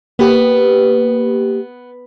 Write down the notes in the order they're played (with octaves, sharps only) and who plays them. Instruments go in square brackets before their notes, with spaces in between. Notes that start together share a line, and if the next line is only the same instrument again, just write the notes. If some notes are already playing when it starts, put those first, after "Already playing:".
[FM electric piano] A#3 G4 [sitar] B3